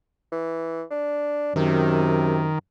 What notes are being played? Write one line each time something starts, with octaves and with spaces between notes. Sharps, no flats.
E3
D4
F#2 C3 D#3